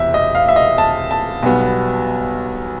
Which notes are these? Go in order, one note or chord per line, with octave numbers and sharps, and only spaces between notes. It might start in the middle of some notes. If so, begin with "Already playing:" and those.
Already playing: E1 E2 C3 E5
D#5
F5
E5
D#5
A5
A5
B1 B2 G3 B3